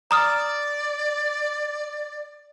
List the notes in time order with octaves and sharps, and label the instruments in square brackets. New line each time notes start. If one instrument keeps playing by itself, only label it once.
[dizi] D5 [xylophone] A#5 D#6 F6